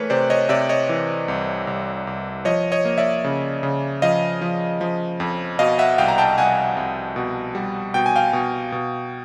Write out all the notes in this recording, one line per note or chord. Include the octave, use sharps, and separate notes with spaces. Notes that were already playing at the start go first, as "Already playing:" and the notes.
Already playing: E3 A3 A#4 B4 C#5
C3 C5 D5
C#5 D#5
C3 D5 E5
C#5 D#5
E3
C2
C2
C2
F3 C#5 D#5
C#5 D#5
A#3
D5 E5
C#3
C#3
F3 D#5 F5
F3
F3
F2
B2 D#5 F5
E5 F#5
C2 F5 G5
A#5
G5 A5
C2 F#5 G#5
C2
B2
G3
B2 G5
G#5
F5 G5
B2
B2